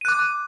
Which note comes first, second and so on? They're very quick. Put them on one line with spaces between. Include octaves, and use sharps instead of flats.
D#7 F#6 D6